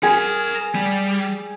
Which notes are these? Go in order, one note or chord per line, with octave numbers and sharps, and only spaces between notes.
G#4 A#4 F#5
G3